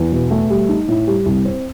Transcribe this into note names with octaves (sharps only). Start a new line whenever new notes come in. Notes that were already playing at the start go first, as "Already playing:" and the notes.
Already playing: E2
B2
A3
G3
D#4
A2
G3
C2
C4